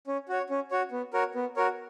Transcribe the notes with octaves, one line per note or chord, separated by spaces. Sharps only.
C#4
F#4 C#5
C#4
F#4 C#5
B3
F#4 A#4 C#5
B3
F#4 A#4 C#5